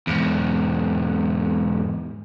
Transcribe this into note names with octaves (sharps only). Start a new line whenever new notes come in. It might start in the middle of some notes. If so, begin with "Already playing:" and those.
E2 G#2